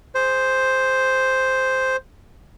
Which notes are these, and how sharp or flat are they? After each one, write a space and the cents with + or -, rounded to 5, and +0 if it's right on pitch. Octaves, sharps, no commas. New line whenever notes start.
G#4 +0 C5 +0